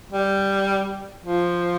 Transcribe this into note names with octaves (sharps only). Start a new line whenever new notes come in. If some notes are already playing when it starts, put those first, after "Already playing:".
G3
F3